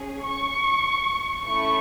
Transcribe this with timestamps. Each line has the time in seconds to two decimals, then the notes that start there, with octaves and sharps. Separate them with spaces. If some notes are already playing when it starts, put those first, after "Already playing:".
Already playing: C#4 G#4
0.22 C#6
1.45 A3 C#4 E4 C#6